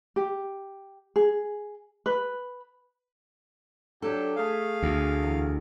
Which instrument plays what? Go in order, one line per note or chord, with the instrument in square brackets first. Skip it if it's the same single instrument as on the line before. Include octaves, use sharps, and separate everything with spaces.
[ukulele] G4
G#4
B4
[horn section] F#3 D4 G4 [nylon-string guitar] A4
[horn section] A3 G#4 [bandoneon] F5
[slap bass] D2
[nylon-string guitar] E2